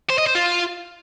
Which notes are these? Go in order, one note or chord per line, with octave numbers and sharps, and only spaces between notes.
C5
D#5
C5
F4